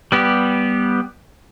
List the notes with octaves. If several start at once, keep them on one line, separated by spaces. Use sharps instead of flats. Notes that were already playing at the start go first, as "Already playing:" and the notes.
G3 B3 G4